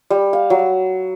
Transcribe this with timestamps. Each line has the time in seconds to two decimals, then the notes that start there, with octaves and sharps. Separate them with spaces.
0.10 G3
0.33 F5
0.50 F#3